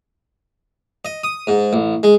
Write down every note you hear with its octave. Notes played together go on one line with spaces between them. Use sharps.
D#5
D#6
G#2
A1
G#3